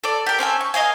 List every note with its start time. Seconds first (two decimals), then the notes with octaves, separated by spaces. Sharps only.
0.04 A4 D5
0.26 G4 A#4
0.39 C4 C#4 A4 G#5
0.61 C#6
0.74 A#4 D#5 F5 G#5